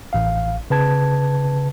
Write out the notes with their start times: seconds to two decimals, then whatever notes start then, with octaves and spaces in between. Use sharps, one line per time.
0.13 A1 F5
0.70 C#3 B4 A5 G#6